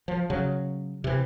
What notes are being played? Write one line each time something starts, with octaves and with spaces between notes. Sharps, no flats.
F3
C#3 F#3
C3 E3